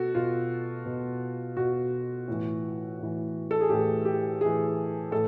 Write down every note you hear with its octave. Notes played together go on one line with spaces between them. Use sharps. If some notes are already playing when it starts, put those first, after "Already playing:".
Already playing: B2 F#4 A4
B2 F4
B2
B2 F#4
A2 E3
A2 E3
A4
G#4
A2 E3 G4
G4
A2 E3 G#4
A2 E3 A4